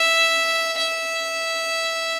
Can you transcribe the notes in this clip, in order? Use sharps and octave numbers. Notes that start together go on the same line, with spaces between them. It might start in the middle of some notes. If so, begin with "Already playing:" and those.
Already playing: E5
E5